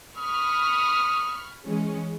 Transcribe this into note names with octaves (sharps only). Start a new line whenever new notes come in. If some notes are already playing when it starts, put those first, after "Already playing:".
B5 C#6 D#6 F6
E3 G#3 C#4